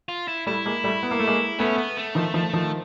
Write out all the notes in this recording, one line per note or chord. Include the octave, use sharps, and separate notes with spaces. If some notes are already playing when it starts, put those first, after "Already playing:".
F4
E4
G3 A3 E4
G#3 A#3
G3 A3
B3
A#3
A3
G#3 A#3
A3 B3 C#4
B3
A3
D#3 F3
D#3 F3
D#3 F3